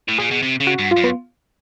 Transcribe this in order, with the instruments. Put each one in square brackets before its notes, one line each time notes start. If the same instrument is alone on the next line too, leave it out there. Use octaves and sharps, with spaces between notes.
[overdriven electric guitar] A2
[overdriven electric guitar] A#2 [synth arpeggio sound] G#4
[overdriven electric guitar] B2
C3
C#3
[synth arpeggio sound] F#4
[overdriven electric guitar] G2
[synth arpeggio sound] F4
[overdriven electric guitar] F#2
[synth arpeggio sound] B3